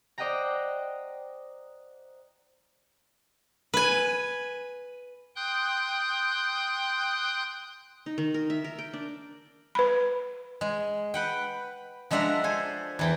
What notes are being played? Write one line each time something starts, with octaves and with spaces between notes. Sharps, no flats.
C5 D5 D#5 F#5 G5 A#5
B4 G#5
G5 C6 D#6 F#6 G6
D#4
D#3
A#4
E5
A#4
G5
D4
B4 B5
G#3
B4 F#5 G5
F3 G#3 D4 E5 F#5 A#5
A4 C5 G#5
E2 E3 G5